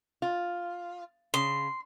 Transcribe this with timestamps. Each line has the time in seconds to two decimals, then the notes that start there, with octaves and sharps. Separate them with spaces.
0.22 F4
1.34 C#3 C6